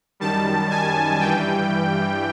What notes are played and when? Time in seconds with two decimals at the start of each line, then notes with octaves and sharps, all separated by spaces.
0.20 F#2 D#3 G3 A5
0.70 G#5
1.20 G2 E3 G3 G5